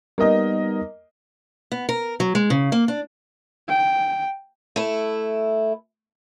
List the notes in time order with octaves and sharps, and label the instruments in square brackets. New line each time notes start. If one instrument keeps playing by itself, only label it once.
[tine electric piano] G3 B3 D#4 [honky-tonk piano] A#3 D#5
[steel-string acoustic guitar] B3
A#4
F#3
G#3
C#3
A#3
D4
[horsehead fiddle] G5
[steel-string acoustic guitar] A3 E4